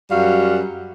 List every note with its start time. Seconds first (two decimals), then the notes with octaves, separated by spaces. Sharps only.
0.10 F#2 G3 F#4 F5